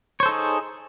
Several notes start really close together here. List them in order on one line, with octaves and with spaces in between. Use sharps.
C#5 C5 A4 D#4 G#4